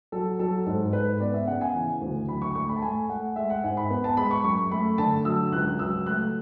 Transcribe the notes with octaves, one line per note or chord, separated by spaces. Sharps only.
F#3 A4
F#3 A4
G#2 A4
G#2 B4
B3 D5
E5
C#3 F#5
G#5
E3
D2
F#3 B5
C#6
A3 C#6
B5
A5
A3 G#5
A3 F#5
G#3 E5
F#5
G#2 G#5
B5
B3
A5
G#3 B5
C#6
F#2 C#6
A3 B5
D3 A5
F#3 E6
C#2 F#6
F#3 E6
A3 F#6